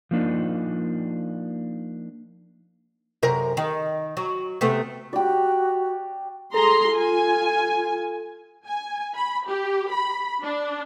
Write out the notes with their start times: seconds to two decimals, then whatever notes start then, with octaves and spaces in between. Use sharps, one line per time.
0.11 F3 A#3 D4 D#4
3.23 F#2 C3 A#4
3.57 D#3
4.17 F#3
4.61 C3 A3 B3
5.13 F#4 G4 D5
6.54 G#4 A4 A#5 C6
6.92 F4 G#5
8.67 G#5
9.16 B5
9.49 G4
9.93 B5
10.43 D4